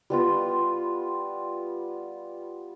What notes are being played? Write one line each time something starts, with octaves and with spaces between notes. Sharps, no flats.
G3 B3 F4